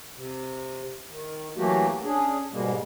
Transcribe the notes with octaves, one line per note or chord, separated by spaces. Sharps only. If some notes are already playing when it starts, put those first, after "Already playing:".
C3
D#3
E3 F#3 A3 A#3 F#4 G4
C#4 D4 G#4
G#2 B2 G3 G#3 A#3